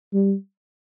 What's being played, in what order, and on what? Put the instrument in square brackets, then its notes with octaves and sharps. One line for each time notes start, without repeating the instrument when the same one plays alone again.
[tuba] G3